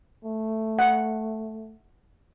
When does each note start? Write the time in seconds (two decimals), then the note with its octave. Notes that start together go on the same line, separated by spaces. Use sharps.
0.24 A3
0.79 F#5